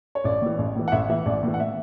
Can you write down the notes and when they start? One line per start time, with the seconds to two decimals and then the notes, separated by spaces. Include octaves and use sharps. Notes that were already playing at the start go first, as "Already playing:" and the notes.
0.15 C#5
0.24 A1 D5
0.42 A2 E3
0.58 A1
0.75 A2 E3
0.88 F#5
0.92 A1 E5
1.09 A2 E3 E5
1.26 A1 D5
1.43 A2 E3
1.54 F#5
1.60 E5